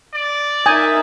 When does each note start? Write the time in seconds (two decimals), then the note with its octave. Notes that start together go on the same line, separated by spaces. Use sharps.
0.14 D5
0.66 D#4 A#4 E5 G#5 D#6 G6